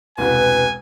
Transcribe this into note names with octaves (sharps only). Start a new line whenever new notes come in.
E1 C2 B4 G#5